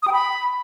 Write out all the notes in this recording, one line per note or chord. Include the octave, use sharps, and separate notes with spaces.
D#6
G5
B5